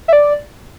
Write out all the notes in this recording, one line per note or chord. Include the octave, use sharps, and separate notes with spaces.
E5
D5